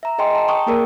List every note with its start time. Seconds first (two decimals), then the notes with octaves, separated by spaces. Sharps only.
0.03 E5 A#5
0.18 G#4 D#5 G5 G#5 C6
0.35 A5 A#5
0.48 G5 C#6 D#6
0.66 A#3 G#4 A#4 D5